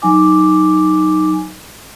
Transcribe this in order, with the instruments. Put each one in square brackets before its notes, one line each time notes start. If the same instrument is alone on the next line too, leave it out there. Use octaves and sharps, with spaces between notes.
[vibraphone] F#3 D#4 G#5 D6